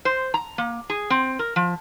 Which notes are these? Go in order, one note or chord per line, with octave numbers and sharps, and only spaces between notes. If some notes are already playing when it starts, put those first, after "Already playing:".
C5
A#5
A#3
G#4
C4
A#4
F3